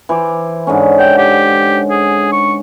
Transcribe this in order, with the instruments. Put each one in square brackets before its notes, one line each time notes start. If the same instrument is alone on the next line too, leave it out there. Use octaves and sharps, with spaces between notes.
[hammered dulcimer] E3 C5 D6
G#2 D3 C#4
[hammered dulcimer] F#5 [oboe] G5
[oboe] G4
G#4
C#6